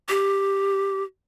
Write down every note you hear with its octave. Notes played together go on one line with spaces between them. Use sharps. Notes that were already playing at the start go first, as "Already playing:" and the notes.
G4